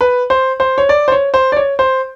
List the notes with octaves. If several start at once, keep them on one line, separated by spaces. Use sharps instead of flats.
B4
C5
C5
C#5
D5
C5
C#5
C5
D5
C#5
C5